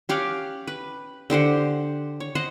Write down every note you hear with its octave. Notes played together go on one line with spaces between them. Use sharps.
C#4 G4 F5 F#5
B4
D3 G4 C5 F#5
C#5
C5 D#5 F#5